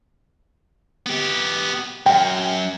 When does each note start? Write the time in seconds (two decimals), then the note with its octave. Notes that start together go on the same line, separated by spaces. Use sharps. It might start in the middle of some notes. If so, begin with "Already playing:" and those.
1.06 B3 G4
2.06 F#2 G5